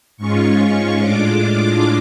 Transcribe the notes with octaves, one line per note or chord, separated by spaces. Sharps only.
G#2 G#3 C#4 F4 C#6
A2 G#3 D4 F4 D6